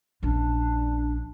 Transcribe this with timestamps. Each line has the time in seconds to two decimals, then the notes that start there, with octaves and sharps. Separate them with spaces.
0.23 A#1 C#4 D4